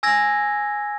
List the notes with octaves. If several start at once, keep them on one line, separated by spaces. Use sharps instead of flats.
G#5 E6 G#6 A#6